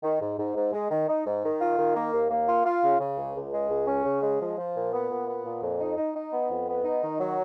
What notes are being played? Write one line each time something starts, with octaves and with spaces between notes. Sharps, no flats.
D#3
G#2
G#2
G#2
G#3
D#3
D#4
G#2
D#3
F4
D#3
A#3
D#2
A#3
F4
F4
C#3
C#3
C#2
C#2
G#3
C#2
C#4
C#3
G#3
F3
F3
A#2
B3
A#2
B3
A#2
F2
D#4
D#4
D#4
B3
F2
B3
D#4
D#3
F#3